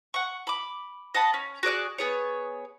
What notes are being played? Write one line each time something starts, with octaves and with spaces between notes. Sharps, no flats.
F#5 C#6
B5 D6
D#5 F#5 A5 B5
C#4
F#4 G#4 D5 F#6
B3 G#4 C#5